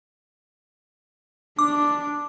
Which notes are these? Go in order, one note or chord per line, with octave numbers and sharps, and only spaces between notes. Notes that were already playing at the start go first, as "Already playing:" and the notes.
D4 D6